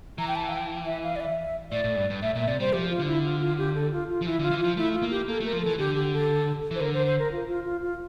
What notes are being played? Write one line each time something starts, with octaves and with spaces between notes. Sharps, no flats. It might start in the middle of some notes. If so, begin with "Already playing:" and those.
E3 A#5
G5
A5
F5
G5
E5
F5
D5
E5
A2 D5
A2
G2
G2
A2 E5
A#2 E5
C3 D5
G3 C5
F3 G4
F4
D3
E4
F4
F4
G4
A4
F4
F4
F3
E3 E4
D3 F4
E3
F3 F4
A3 E4
F4
A#3
G4
A#3 A4
A3 A#4
F3
E3 A4
D3 G4
G4
A4
E3
C5
D3 A#4
C5
C5
A#4
F4
F4
F4
F4